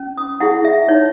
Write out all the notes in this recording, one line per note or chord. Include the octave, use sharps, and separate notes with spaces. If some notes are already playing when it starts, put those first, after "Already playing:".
Already playing: C#4
D#6
E4 G#4 F#5
E5
D#4 C#5